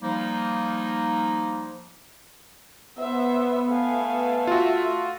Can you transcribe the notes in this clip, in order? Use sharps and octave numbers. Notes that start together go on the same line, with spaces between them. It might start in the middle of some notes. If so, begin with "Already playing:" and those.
F3 G3 A#3 D#4
B3 C5 E5
A3 F5 G#5
F4 F#4 E5